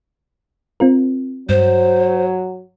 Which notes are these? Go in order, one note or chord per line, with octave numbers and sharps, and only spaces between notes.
C4 F4 A#4
G2 F#3 C5